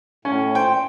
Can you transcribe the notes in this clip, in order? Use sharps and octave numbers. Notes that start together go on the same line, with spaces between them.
A2 C#4
A#2 C5 G5